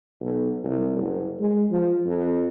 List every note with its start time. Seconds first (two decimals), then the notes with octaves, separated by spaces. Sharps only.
0.21 B1
0.64 C2
0.96 F#1
1.40 G#3
1.71 F3
2.06 F2